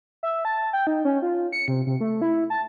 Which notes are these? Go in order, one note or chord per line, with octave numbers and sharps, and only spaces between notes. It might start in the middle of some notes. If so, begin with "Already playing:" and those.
E5
A5
G5
D#4
C#4
F4
C#7
C3
C3
A3
E4
A5